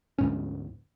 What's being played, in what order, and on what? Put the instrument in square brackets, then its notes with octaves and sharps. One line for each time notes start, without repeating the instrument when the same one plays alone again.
[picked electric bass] D2 G#2 C#4